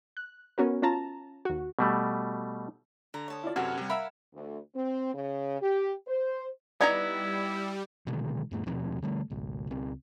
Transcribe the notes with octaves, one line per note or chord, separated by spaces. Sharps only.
F#6
B3 C#4 F#4 A#4
C#4 F4 A5 A#5
D#2 F#4
B2 G3 A3
D3 A#5
C#5 A5 D#6
E4 F4 D5
F#2 C3 F#4 A4 B4 F#5 F6 G#6
C3 G3
A#4 E5 F5 B5 E6
D2
C4
C#3
G4
C5
G3 B3 D#4 E4 D5 A#5 G#6
B2 D3 D#3 G#3
F2 A2 A3
D#2 B2 F3 C4
D3 G3 A3
G#1 C#2
C#2 C4